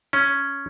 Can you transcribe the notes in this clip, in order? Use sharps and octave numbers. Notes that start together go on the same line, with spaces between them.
C#4